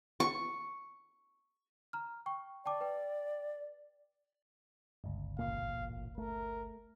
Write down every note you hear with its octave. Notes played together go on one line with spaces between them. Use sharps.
C#6
A#5 F6
G5 C#6
D5 G5 A5 D6
B4 G5
G1 C#2
A1 A#2 A#3 F5
A3 A#4